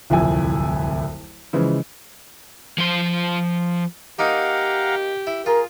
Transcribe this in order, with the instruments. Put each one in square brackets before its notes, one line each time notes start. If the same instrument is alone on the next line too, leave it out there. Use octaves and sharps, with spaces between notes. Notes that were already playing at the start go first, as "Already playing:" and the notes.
[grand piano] D1 C2 F2 E4 G#5
C#3 E3 F3 G#3
[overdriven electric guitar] F3 C5
[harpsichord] A#3 D#4 G#5 [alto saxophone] G4 [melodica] F5 F#5 A#5
[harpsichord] E4
[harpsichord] F4 [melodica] G#4 [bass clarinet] A#4